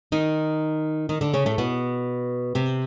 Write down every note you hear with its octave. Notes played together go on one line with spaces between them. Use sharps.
D#3 D#4
D#3 D#4
D3 D4
C#3 C#4
A2 A3
B2 B3
C3 C4